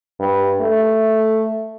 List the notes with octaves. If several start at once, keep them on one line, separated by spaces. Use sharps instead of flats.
G2
A3